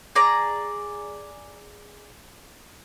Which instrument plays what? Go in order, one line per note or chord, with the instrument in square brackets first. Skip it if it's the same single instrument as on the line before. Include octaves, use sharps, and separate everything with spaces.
[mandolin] G#4 D5 A#5